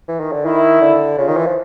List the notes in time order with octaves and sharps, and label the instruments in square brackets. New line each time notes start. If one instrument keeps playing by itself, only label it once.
[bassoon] E3
D#3
D3
[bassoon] D#3 [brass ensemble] E4
[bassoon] D3
[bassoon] C#3 [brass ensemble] F4
[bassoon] D#3
E3
F3